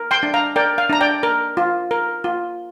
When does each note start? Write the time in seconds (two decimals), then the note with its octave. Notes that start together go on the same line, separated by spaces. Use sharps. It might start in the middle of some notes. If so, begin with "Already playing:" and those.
Already playing: A#4
0.11 G5 C6
0.23 D4
0.34 F5 A#5
0.56 A#4 D5 G5
0.78 F5
0.90 D4 A#5
1.01 D5 G5
1.23 A#4
1.57 F4
1.91 A#4
2.24 F4